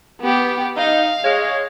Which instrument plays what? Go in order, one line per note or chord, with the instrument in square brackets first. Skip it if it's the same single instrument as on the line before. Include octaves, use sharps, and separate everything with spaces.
[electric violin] B3 G4
[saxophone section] D#4 [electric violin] F5
[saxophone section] G#3 C#5